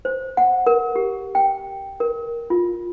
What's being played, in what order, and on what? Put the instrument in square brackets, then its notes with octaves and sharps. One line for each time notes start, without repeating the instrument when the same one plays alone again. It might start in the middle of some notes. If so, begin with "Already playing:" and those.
[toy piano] C5
F#5
A#4
G4
G5
A#4
F4